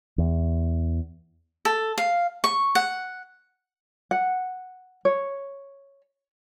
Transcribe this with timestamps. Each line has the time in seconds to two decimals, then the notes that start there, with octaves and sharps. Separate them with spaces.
0.18 E2
1.65 A4
1.98 F5
2.44 C#6
2.75 F#5
4.11 F#5
5.05 C#5